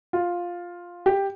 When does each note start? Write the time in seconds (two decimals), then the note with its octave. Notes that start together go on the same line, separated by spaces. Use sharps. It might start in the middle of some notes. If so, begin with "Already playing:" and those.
0.13 F4
1.06 G4